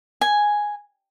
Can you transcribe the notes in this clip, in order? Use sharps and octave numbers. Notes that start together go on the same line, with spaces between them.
G#5